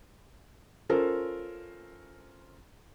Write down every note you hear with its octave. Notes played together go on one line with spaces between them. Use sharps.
C#4 F4 A4 A#4 C5